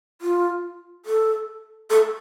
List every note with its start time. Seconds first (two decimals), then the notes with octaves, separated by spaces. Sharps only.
0.22 F4
1.06 A4
1.90 A4